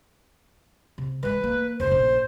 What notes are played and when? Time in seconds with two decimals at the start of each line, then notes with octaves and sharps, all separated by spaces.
0.98 C3
1.23 E3 G#3 B4
1.44 A#3
1.80 F1 C#2 C5
1.91 A#1 C#4